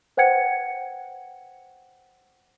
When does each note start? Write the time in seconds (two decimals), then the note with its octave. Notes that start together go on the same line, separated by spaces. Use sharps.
0.17 B4 C5 F#5 G5 G#6 C#7